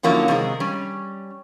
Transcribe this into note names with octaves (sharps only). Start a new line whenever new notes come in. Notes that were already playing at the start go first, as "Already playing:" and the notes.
D3 F3 F#3 A#3 C#4 E4
C3 D#3 G#3 A#4
G3 C#4